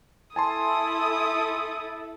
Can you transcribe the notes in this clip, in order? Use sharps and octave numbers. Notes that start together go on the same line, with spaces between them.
E4 A4 G#5 A5 C6 D#6